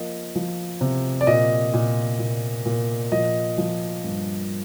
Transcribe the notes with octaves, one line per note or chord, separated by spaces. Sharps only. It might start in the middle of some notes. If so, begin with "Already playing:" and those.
Already playing: F3 A#3 D#5
F3
C3
D5
A#2 D#5
A#2
A#2
A#2
F3 D#5
F3
G2